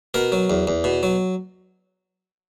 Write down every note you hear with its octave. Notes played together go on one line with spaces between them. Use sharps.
B2 A#4
F#3
E2
E2
B2
F#3